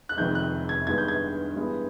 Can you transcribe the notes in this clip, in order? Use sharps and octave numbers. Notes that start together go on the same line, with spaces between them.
F#6
F1 F2 C3 D#3 G#3 G6
F#6
G#6
G2 D#3 G#3 B3 G#6
G6
G#6
G2 E3 G#3 B3